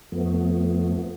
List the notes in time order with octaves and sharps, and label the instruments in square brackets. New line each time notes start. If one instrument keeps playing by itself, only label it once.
[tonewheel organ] F2 F3 A3 B3